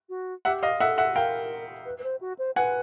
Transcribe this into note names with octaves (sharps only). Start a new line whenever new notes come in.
F#4
G4 E5 F#5
D#5 F5
A4 E5 F#5
E5 F#5
A#4 F5 G5
B4
B4
C5
F#4
C5
B4 F#5 G#5